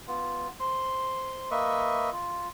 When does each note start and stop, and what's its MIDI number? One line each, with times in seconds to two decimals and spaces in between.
0.08 0.48 59
0.08 0.48 65
0.60 1.49 72
0.60 1.49 84
1.51 2.10 58
1.51 2.10 71
1.51 2.10 75
1.51 2.10 76
1.51 2.10 85
2.12 2.48 65